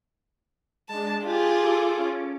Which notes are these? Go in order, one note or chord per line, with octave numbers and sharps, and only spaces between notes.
G#3 D4 A5
F4 G4 G#4 A6
A4 D6
C#4